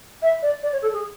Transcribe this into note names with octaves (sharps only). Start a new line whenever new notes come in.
E5
D5
D5
C#5
A4
G#4